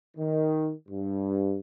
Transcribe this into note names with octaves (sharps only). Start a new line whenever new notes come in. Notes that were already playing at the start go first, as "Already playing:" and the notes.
D#3
G2